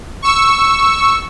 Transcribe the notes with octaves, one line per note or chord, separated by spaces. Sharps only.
C#6 E6